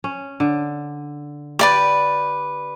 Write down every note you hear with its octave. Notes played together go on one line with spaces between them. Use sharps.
C#4
D3
G4 B4 D5 D6